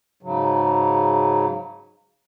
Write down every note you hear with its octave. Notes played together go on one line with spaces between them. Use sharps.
G#2 C#3 F#3